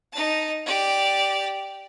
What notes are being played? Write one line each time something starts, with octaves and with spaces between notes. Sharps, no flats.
D#4 A5
G4 D5